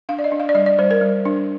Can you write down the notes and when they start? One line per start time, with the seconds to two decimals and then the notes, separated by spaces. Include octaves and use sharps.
0.09 D4 F5
0.19 D5
0.24 D#5
0.32 D4
0.40 F5
0.49 D5
0.55 G3 D#5
0.66 D5
0.79 G3 C5
0.91 A#4
1.01 G3
1.25 D4